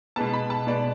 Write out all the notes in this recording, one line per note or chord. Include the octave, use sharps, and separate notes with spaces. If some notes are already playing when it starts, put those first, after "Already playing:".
B2 G#3 B3 A5
B5
A5
B2 G#3 B3 D5